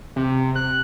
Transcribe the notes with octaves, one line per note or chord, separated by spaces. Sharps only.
C3
F#6